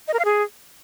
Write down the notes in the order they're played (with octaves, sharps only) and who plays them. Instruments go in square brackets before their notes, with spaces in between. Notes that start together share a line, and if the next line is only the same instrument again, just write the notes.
[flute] D#5
A#4
F5
G#4